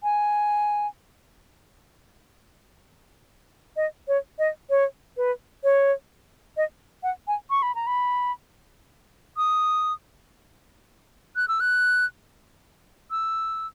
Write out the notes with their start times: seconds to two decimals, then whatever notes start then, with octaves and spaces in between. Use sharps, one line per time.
0.03 G#5
3.76 D#5
4.08 C#5
4.39 D#5
4.70 C#5
5.17 B4
5.64 C#5
6.57 D#5
7.03 F#5
7.27 G#5
7.50 C#6
7.62 B5
7.75 A#5
7.87 B5
9.37 D#6
11.36 F#6
11.48 E6
11.60 F#6
13.11 E6